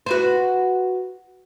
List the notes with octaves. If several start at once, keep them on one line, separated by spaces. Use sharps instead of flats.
F#4 B4 C5